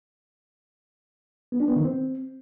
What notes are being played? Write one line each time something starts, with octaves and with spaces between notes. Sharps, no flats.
B3
D4
B3
D#3
C4